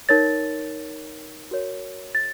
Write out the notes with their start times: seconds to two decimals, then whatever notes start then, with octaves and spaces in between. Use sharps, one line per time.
0.09 D#4 A#4 C#5 A6
1.51 F#4 A#4 C#5
2.15 A6